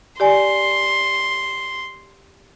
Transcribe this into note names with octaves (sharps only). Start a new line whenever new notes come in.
G4 D5 G#5 C6